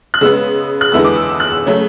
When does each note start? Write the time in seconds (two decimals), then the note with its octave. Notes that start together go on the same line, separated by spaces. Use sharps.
0.14 F#6
0.21 C#3 G#3 B3 E6
0.81 F#6
0.92 E2 D3 G#3 B3 E4 E6
1.04 D6
1.16 E6
1.29 E6
1.40 F#6
1.52 E6
1.66 C#3 F#3 A3